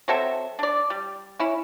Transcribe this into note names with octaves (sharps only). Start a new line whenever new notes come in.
F#3 C4 A4 E5
D4 D5
G3
C#4 E4